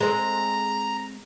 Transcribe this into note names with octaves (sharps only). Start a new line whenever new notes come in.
G#3 C4 A#5